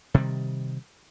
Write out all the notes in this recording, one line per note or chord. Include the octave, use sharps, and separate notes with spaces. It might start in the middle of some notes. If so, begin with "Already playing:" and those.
C3 D#3 G3